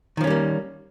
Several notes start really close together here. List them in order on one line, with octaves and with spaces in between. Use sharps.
D#3 F3 C#4 G3 A#3